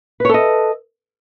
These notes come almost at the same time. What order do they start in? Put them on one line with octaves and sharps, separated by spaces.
B4 C#5 A4 D#5